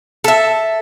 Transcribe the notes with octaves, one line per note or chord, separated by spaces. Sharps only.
A4 E5